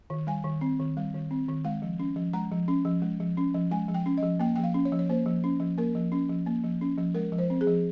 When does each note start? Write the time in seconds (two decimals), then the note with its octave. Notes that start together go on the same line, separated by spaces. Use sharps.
0.10 D#3
0.27 G3 G#5
0.44 D#3
0.61 C4
0.80 D#3
0.97 G3
1.14 D#3
1.31 C4
1.48 D#3
1.65 G#3 F5
1.82 F3
1.99 C#4
2.16 F3
2.33 G#3 A#5
2.52 F3
2.68 C#4
2.85 F3
3.02 G#3
3.20 F3
3.37 C#4
3.54 F3
3.71 G#3 G#5
3.88 F3
3.94 G5
4.06 C#4
4.18 D#5
4.23 F3
4.40 A#3 G5
4.56 F3 G5
4.63 F5
4.74 C#4
4.85 C#5
4.92 F3
4.99 C#5
5.09 A#3 C5
5.26 F3
5.44 C#4
5.60 F3
5.78 A#3 A#4
5.95 F3
6.12 C#4
6.29 F3
6.46 A#3
6.64 F3
6.81 C#4
6.98 F3
7.14 G#3 A#4
7.32 F3
7.38 C5
7.50 C4
7.61 G#4
7.67 F3